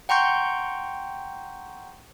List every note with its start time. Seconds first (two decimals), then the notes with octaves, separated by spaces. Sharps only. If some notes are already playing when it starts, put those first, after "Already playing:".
0.09 F#5 G5 A#5 C6 C#6 G6